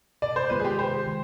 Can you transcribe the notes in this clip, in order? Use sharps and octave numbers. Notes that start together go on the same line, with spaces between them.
C3 D5
C5
D#3 G#3 B3 F4 B4
G#4
G4
C3 C5
D#3 G#3